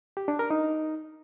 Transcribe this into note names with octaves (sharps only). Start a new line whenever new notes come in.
G4
D4
A#4
D#4